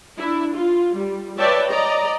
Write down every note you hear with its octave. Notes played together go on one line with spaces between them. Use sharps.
D4 E4
F4
G3
B4 C#5 D5 E5 G5 A5
D5 D#5 A#5